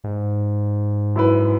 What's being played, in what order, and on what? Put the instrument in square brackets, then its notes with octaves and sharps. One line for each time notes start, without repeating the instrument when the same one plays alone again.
[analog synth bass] G#2
[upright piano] F#2 E4 B4